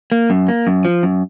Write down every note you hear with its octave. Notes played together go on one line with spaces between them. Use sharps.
A#3
F#2
A#3
F#2
F3
F#2